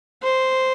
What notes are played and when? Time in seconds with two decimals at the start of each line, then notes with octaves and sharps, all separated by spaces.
0.23 C5